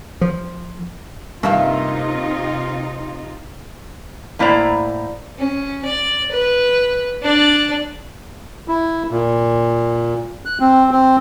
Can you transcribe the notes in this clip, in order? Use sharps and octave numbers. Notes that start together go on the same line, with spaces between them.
F3
G2 C3 A#3 D#4 F4 E5 F5
A2 A#3 E4 C5 D5 A#5
C#4
D5
B4
D4 D5
E4
A#2
F#6
C4
C4